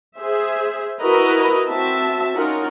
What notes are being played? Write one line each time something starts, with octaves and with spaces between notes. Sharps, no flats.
G#4 C5 E5
E4 F#4 A#4 B4 D#5 A#5
C4 F#4 E5 A5
C#4 D#4 F4 A#4 F#5